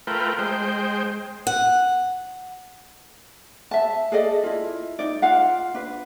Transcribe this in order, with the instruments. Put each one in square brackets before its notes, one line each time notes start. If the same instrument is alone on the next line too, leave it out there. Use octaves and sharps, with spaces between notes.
[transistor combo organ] A3 F4 A#4 B4 G5
G#3 C5 G5
[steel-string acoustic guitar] F#5
[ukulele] E5 A5
G#4 A4 D5 D#5
E4 F4
D#4 D5
F4 F5 F#5
D4 B4